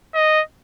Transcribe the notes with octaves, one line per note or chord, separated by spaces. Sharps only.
D#5